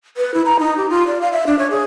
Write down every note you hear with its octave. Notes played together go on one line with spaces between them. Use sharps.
B4
E4
A#5
D#4
G4
F4
D5
F5
E5
D4
C#5
G#4